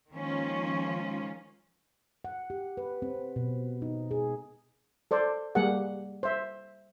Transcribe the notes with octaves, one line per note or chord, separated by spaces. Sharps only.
D#3 F3 G#3 A#3 C#4 F4
F#5
G4
B4
C4
B2
D#4
G#4
A4 C5 D5
G3 A#3 G4 G#4 A#4 F#5
C5 E5